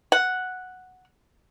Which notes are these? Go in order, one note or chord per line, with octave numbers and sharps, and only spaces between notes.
F#5